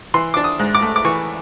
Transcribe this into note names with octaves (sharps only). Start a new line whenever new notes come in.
E3 C6
D4 D6
D#6
G#2
D6
A3
D6
E3 C#6